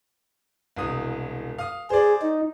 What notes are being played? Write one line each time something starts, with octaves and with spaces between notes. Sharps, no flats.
E1 C2 D#6
F5 D#6
G#4 C5 D5
D#4